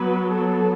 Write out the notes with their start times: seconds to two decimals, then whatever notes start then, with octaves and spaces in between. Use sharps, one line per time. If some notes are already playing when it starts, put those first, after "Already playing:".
Already playing: F#3 B3 B4
0.30 A4